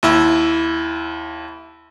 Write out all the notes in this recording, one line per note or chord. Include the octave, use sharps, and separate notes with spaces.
D#2 E4 E6